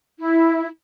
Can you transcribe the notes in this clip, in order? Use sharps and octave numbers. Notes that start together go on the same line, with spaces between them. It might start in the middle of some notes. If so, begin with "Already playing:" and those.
E4